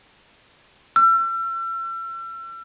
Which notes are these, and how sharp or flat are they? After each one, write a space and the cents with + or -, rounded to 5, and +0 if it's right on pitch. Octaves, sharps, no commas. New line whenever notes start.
E6 +40